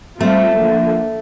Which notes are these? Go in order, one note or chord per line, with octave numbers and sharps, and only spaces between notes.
G3 A3 C4 F4 A4
D3 F3 A#3